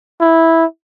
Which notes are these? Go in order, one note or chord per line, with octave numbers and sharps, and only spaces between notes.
E4